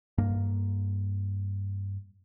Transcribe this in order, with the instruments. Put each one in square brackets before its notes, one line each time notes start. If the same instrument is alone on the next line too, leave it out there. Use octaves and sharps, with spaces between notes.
[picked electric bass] G2 A#3